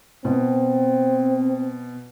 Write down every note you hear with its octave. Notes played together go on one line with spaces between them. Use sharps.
B2 C4